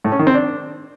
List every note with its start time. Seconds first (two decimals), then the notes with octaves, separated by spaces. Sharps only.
0.04 A2
0.12 C#4
0.19 D#3
0.27 C4
0.34 D4